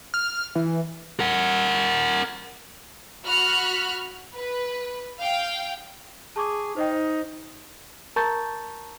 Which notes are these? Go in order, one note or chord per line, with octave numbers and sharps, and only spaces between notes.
F6
E3
A#4 F#5
F#4 B5 F6 F#6
B4
F5 G5
G#4 A5 C#6 D6
D#4 C5 D#5 G5
C5
A#4 A5 A#5 C#6 G6 A6